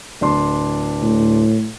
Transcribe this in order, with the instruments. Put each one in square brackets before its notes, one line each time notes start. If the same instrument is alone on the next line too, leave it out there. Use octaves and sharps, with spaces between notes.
[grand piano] D1 D4 C6
[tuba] A2